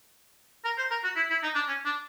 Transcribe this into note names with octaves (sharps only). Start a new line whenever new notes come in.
A#4
C5
A#4
F#4
E4
E4
D#4
D4
C#4
D4